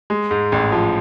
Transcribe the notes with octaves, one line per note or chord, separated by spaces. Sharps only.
G#3
G#2
A1
F3